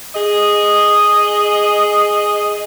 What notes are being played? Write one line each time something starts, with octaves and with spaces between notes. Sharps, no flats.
G#4 D#5